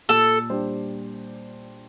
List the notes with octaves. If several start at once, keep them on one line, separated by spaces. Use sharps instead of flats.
A#2 A4
G3 D4 G4 C5